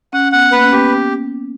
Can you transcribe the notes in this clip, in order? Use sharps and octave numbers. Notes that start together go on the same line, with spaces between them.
C#4 F#5
B3 F#5
A#3 B4
C#4
B3 G4